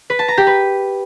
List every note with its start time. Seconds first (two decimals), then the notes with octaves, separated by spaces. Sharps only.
0.10 B4
0.19 A5
0.28 A#5
0.38 G4
0.47 B4